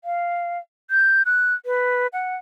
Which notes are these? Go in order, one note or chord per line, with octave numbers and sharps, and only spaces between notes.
F5
G6
F#6
B4
F#5